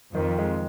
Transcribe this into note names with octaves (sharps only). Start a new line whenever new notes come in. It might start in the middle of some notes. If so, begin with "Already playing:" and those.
F2 D#3
G#3